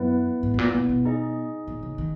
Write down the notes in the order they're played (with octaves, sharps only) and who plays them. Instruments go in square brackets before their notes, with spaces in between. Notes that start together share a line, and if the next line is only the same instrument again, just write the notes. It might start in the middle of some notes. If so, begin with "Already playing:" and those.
Already playing: [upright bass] F#2 [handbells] B3 E4 B4 F#5
[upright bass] G#2
G#2
A#2
B2
B2
[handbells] D#4 G#4 D#5
[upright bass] A#2
C#3
D#3